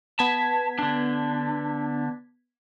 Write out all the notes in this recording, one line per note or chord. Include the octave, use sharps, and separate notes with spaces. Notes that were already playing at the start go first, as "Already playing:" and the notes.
B3 A5 G#6 B6
D3 D4